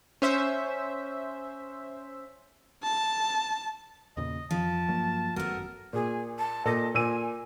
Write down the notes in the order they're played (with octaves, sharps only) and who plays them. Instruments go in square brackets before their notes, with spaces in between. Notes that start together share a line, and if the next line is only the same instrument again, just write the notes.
[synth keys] C#4 C5 E5
[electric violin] A5
[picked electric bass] E2 A#2 C#3 [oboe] D#5
[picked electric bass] F2 [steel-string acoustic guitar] F3 [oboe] A5
[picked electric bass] G2 F#3 A#3
[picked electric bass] G#1 F#2 F#3 [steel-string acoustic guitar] A3 B3 [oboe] A#4
[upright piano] A#2 [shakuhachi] G#4
[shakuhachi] A5
[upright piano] A#2 A4 A5 [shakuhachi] D#5
[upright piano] A#2 E6 D#7 [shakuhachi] G#5